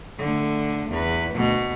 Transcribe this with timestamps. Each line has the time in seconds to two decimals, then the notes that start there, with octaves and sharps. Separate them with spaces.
0.18 D3 A3
0.90 E2 B4
1.34 D2 B2